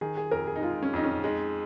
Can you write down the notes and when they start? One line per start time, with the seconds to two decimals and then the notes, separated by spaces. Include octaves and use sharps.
0.01 D#3 G#4
0.17 G#4
0.31 F2 A#4
0.47 G#4
0.56 D#4
0.62 G#3 F4
0.83 C#4
0.93 F2 D#4
1.04 C#4
1.23 G#3 D#4